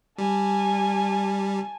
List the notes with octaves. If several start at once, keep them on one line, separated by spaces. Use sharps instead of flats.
G3 G#5 A5